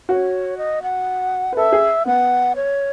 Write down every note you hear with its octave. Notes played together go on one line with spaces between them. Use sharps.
F#4 C#5
D#5
F#5
B4
A4 E5
G#4
B3 F#5
C#5